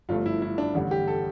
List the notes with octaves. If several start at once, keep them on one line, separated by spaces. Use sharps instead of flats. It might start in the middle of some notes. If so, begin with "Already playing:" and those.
G1 G2 F3 A3 F4
E4
E4
D4
A1 G2 D3 G3
G4
A4